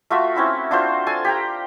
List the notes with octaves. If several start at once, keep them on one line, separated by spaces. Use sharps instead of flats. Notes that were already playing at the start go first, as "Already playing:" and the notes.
A3 F4 F#4 E5
C4 C#4 E4 F#4
D4 F4 F#4 C5
A4 D5 G#5 A5
G4 G5 A#5